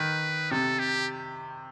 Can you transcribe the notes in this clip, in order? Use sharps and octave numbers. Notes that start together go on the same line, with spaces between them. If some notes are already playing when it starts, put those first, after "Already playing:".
Already playing: D#3 B4
C3 A4
G4